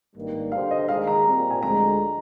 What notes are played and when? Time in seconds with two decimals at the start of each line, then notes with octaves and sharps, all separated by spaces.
0.15 G#1 G2 D#3 G3 A#3
0.52 D3 G3 D4 G4 C5 F5
0.71 D#5
0.88 D#2 D#3 G#3 D#4 G#4 F5
1.07 A#5
1.26 A#2 G3 C4
1.50 G#5
1.63 D2 D3 F3 G#3 A#5